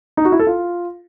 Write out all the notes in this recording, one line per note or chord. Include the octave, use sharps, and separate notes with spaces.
D#4
F#4
E4
A4
F4